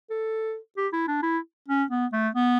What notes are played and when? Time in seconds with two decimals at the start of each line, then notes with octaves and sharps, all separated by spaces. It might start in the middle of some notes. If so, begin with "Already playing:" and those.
0.10 A4
0.77 G4
0.93 E4
1.08 D4
1.23 E4
1.68 C#4
1.91 B3
2.13 A3
2.35 B3